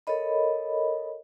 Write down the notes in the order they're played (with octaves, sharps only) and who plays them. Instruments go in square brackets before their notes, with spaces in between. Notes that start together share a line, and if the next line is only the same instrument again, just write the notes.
[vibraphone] A4 A#4 C#5 D#5 B5